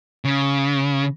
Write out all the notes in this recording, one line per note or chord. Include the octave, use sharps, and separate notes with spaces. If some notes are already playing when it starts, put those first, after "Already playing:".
C#3